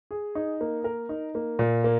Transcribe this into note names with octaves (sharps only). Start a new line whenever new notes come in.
G#4
D#4
A#3
A#4
D#4
A#3
A#2
A#3